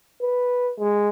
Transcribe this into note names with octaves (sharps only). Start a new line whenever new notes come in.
B4
G#3